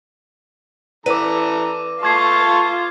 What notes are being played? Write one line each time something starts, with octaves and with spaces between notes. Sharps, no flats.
E3 A4 B4 D5 F#5 A#5 D6 D#7
F4 A4 A5 C#6 D6 G#6 C7